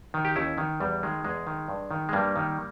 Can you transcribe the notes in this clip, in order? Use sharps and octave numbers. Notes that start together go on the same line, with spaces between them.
D#3
G4
D#2 C#4 E4
D#3
E2 G3
D#3 G#3
E2 G#3
D#3
G2
D#3
G#3
G2 G3 A#3
D#3